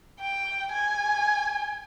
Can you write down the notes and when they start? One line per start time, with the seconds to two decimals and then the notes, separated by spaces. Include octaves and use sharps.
0.20 G5
0.72 G#5